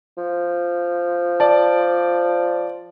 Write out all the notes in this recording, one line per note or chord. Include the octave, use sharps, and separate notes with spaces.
F3
D5 A5